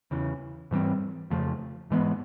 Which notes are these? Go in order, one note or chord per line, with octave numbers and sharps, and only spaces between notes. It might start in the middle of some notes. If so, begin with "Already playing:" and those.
E2 C#3 E3
G#2 E3 G3 C4
F2 C#3 F3 A3
G#2 E3 G#3 B3